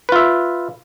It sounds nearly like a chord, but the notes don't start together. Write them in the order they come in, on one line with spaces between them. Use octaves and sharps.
B4 F4 E5